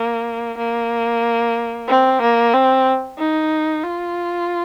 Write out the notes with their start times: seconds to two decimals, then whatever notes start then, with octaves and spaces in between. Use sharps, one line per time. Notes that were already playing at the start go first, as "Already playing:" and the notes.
Already playing: A#3
0.58 A#3
1.88 C4
2.21 A#3
2.54 C4
3.18 D#4
3.84 F4